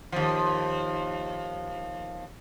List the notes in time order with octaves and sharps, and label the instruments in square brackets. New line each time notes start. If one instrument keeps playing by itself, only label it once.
[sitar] D#2 F3